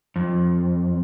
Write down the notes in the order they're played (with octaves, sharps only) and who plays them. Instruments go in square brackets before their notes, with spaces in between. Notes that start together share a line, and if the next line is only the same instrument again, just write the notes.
[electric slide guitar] F2